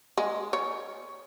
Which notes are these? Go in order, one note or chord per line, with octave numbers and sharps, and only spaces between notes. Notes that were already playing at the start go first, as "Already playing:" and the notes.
G#3
C#5